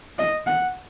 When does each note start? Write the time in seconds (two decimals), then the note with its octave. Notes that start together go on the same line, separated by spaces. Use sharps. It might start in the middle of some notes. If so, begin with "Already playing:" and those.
0.19 D#5
0.47 F#5